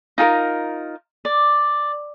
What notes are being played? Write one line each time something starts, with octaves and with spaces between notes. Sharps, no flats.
D#4 F4 A4 A#4
D5